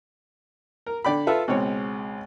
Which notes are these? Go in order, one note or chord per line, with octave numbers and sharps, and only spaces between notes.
A#4
D3 D5 G5 B5
F4 A4 B4 E5
C#2 B2 C4 C#5